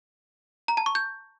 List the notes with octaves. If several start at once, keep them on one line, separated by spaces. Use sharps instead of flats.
A#5
A5
C#6
G6